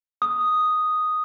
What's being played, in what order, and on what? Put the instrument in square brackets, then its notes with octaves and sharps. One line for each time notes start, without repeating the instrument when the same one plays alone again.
[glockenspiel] D#6